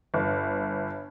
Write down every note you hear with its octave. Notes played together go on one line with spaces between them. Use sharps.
G1